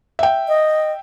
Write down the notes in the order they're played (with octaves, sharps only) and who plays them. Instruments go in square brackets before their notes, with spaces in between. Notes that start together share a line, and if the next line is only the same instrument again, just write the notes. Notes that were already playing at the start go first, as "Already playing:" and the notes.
[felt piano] E5 G5
[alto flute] D#5